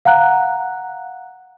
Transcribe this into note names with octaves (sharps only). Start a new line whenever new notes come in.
F5 F#5 A#5 F#6